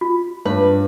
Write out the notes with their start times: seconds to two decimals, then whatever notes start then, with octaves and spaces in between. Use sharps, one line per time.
0.01 F4
0.46 G2 B4 C#5